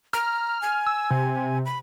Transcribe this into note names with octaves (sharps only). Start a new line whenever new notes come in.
A#5 F6
G#5
E6
C3
B5